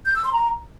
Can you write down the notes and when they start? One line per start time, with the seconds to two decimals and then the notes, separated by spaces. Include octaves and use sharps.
0.06 G6
0.15 E6
0.24 C6
0.33 A#5